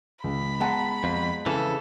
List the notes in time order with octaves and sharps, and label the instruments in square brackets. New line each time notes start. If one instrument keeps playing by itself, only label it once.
[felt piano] C#2 [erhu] B5
[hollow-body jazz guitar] G#3 B3 [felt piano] F#5 A5 A#5
[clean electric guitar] F2
[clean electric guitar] C#3 E3 [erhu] A4